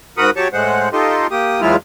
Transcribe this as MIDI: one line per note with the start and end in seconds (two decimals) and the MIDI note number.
0.17 0.30 44
0.17 0.30 66
0.17 0.30 70
0.17 0.30 78
0.17 0.30 83
0.17 0.30 87
0.36 0.48 54
0.36 0.48 67
0.36 0.48 73
0.36 0.48 81
0.36 0.48 85
0.53 0.89 45
0.53 0.89 56
0.53 0.89 72
0.53 0.89 78
0.93 1.27 63
0.93 1.27 65
0.93 1.27 67
0.93 1.27 69
0.93 1.27 75
0.93 1.27 84
1.31 1.61 58
1.31 1.61 67
1.31 1.61 87
1.61 1.76 40
1.61 1.76 54
1.61 1.76 56
1.61 1.76 64
1.61 1.76 65
1.61 1.76 89